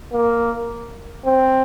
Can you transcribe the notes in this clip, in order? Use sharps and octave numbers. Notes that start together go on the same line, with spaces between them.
A#3
C4